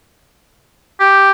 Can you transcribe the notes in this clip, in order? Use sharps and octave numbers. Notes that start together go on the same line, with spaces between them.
G4